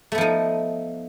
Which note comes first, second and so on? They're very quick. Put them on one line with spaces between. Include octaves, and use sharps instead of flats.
A3 B3 F3 D#4